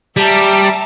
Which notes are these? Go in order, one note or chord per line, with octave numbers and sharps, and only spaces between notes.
G3 E5 A5 A#5